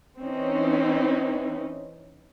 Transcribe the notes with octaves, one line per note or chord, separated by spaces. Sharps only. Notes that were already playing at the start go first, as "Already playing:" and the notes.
E3 C4 C#4 D#4